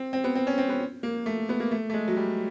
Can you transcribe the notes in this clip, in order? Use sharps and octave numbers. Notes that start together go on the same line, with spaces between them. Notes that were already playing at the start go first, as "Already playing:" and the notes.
Already playing: C4
C4
B3
C4
C#4
C4
B3
A#3
A3
B3
A#3
A3
A3
G#3
F#3
G3